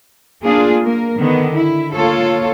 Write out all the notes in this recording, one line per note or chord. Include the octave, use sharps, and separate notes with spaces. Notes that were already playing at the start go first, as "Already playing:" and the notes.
A#3 D4 F4 G#4
A#3 A#4
D3 D#3 B3
E4
A#3 F4 A4 C#5